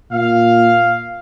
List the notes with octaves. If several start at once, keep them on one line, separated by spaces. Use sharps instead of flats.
A#2 F5